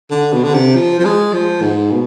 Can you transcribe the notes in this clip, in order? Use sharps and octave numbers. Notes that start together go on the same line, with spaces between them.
D3
B2
D3
C3
F3
F3
G#3
F3
G#2
B2